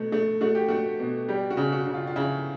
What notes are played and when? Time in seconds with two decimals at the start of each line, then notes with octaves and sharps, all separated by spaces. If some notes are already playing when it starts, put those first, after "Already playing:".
Already playing: B2 A3
0.12 A3
0.41 A3 F#4
0.55 G4
0.68 A3 F#4
1.00 B2
1.28 G3 G4
1.51 F#4
1.57 C#3
1.72 F#4
1.87 C#3
1.94 F4
2.07 F4
2.16 C#3 E4